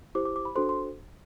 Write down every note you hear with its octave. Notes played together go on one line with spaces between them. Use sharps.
E4 G4 C5 D6
D6
D6
B5
D4 F#4 A4 C5 C6
C6